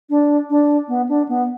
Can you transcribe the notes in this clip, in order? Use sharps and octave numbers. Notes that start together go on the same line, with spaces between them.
D4
D4
B3
D4
B3